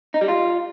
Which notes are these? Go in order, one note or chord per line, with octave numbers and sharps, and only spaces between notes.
D#4
G3
F4